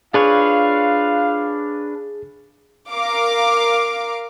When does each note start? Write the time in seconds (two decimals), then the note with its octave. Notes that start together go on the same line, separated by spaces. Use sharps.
0.14 D4 F4 G#4 B4 C#5 F5
2.90 A#4 F5 D6